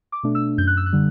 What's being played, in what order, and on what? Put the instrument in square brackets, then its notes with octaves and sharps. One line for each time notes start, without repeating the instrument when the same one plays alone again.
[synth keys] D6
B2 A3 D4
E6
F#2 G6
F#6
E6
F#6
D3 G3